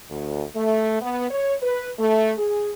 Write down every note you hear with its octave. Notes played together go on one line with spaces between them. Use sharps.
D2
A3
B3
C#5
B4
A3
G#4